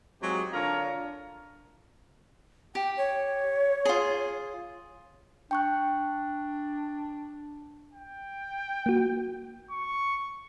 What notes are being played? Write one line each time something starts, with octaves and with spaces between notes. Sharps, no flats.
F#3 G#3 C4 D#4 F4 G4
D3 D4 F4 A#4 C#5 A#5
G4 G5
C#5
F4 G#4
D4 G5 C#6 F#6
G5
A#3 F#4
C#6